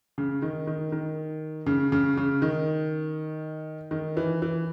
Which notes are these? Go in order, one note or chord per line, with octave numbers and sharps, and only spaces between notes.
C#3
D#3
D#3
D#3
C#3
C#3
C#3
D#3
D#3
E3
E3